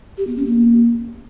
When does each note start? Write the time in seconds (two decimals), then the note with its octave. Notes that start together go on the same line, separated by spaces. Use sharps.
0.18 G4
0.27 B3
0.37 C#4
0.46 A#3